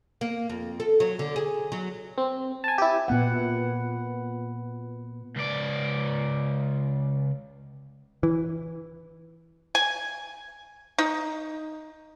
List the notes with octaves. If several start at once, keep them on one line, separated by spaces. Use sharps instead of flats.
A#3
F2
A4
F#3
D3
G#4
F#3
C4
G#5 A5
E4 G4
A#2 B3 F#5
C#2 D5
E3
G#5
D#4